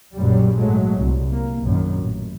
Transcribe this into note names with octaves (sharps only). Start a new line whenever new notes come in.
A#1 F#2 A#2 F#3 G3
G#2 F#3 G#3 A3
C2
A#3
A#1 F#2 A#2 D#3
A1